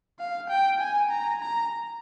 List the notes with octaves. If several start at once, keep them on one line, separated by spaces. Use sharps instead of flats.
F5
G5
G#5
A#5
A#5